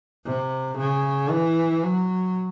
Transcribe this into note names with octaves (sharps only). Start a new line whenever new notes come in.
C3
C#3
E3
F#3